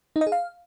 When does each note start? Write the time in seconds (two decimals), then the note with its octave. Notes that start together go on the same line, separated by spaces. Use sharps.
0.16 D#4
0.21 D#5
0.27 G#4
0.32 F5